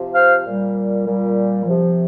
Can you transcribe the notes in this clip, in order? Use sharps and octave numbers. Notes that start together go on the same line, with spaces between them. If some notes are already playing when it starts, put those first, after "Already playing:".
Already playing: C3 F3
C5 F5
A#2 G3
A#2 G3
C3 F3